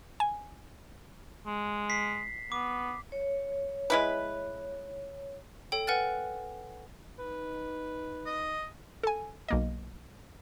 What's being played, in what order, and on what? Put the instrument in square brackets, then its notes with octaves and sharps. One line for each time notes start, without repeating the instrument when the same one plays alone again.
[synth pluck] G#5
[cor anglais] G#3
[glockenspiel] B6 C7
[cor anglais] B3 [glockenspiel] D6
[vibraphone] C#5
[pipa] G#3 E4 B4
[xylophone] A4 C#5 G5
B4 F#5 G#5 F6 F#6 A6
[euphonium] D#4 [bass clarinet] B4
[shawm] D#5
[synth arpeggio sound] A4 G#5
B1 A#3 D#5